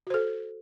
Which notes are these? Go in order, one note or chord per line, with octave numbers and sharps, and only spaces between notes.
F#4 A4 C5